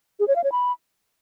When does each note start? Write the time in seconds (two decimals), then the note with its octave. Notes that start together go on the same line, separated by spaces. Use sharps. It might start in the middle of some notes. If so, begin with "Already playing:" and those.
0.20 G#4
0.28 C#5
0.36 F5
0.44 C#5
0.52 B5